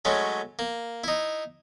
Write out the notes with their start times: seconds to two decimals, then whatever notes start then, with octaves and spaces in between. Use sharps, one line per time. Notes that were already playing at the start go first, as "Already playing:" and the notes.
0.05 F#3 G#3 A3 C#4
0.59 A#3
1.04 D#4 E4